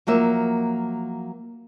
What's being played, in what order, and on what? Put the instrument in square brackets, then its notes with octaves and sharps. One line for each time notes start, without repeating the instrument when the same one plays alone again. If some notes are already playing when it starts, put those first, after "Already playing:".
[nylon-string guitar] F3 F#3 A#3 E5